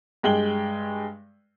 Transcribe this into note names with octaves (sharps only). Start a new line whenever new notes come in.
G2 G#3 G5 F#7 G7